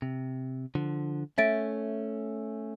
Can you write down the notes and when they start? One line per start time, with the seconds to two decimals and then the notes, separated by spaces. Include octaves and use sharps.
0.02 C3
0.75 D3 F3
1.38 A3 C#4 E5 A6 D7